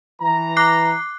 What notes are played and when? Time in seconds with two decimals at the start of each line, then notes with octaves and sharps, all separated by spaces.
0.21 E3 A#5
0.57 D6 F#6 C7